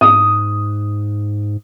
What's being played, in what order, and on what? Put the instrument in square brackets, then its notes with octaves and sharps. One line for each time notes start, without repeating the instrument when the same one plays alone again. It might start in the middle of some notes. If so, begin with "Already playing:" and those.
[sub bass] G#2 [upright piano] D#6